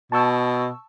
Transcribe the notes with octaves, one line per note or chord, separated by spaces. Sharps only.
B2 A5 C#6 E6